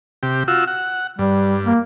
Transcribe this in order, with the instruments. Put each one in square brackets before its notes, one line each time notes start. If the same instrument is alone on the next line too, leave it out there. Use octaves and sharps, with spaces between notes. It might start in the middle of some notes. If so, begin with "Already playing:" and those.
[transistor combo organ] C3 G4
F4 F#4 E6
F#5
[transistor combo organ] G2 [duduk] G3
[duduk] A#3